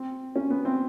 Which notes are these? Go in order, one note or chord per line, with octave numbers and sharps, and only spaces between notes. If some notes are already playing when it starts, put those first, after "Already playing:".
Already playing: C4
C#4
B3
C4